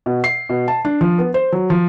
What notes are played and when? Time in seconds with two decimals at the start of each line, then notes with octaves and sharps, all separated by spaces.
0.06 B2
0.24 C7
0.49 B2
0.68 A5
0.85 D4
1.01 F3
1.18 B3
1.34 C5
1.52 F#3
1.70 F3